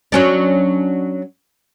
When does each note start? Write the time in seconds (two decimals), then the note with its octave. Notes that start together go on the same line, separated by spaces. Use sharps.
0.12 F#3 C#4 D4